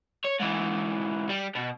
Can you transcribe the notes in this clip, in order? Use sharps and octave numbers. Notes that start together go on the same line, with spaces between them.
C#5
G#2 E3
G3
B2